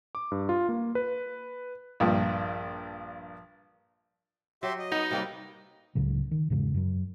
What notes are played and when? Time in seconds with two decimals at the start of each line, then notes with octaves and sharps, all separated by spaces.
0.15 D6
0.32 G2
0.49 F4
0.69 A#3
0.95 B4
2.00 A#1 G2
4.63 F#3 G4 E5 C6
4.79 D#5
4.92 B3 D#4
5.11 C3 G3 A#3 B4
5.95 C#2 A2 C#3 F#3
6.31 D#3
6.50 E2 G#2 C#3 G#3
6.74 F#2 F#3